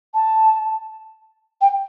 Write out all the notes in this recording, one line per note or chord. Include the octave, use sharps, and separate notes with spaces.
A5
G5